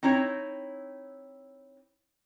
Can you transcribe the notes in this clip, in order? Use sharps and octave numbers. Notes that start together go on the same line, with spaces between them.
C4 D#4 E4 C#5